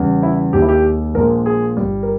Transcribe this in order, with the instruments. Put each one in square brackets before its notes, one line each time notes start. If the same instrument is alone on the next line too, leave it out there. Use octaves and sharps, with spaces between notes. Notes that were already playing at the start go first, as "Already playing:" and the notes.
Already playing: [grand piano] E2 C#3 G3
E4
D#2 D#3 G#3 G4
E4
G4
A#1 A#2 G#3 A#4
G#4
G1 G2 G3
A#4